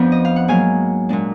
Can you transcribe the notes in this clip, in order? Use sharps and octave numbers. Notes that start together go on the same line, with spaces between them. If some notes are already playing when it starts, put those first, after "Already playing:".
Already playing: F2 F3 B3 D4
D#5
F5
F#5
G#2 F#3 A#3 F5 G#5
A#2 G#3 D4